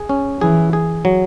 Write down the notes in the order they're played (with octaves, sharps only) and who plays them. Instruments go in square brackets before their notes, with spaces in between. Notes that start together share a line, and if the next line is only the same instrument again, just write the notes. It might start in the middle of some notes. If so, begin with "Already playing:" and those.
Already playing: [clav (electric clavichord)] G#4
C#4
[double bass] E3 [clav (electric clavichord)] G#4
[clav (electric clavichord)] G#4
F#3